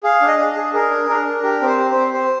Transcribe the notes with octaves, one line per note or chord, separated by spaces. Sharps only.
G#4 F5
D4
D#5
D4
G#4
G#4 A#4
D4
D4 A#4
D4
G4 A#4
C4
C5
G4
C5
C4
C4 C5